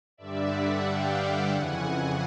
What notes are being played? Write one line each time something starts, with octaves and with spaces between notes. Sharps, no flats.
G2 D3 G3 D5 E5
E5 F#5
F5 G5
F2 C#3 E3 F#5 G#5